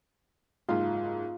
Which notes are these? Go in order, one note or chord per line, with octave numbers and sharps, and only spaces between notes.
F#1 G#2 F4